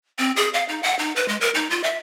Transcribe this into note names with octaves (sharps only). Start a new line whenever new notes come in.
C4
G#4
F5
D#4
F#5
D#4
B4
G#3
A#4
D#4
F4
E5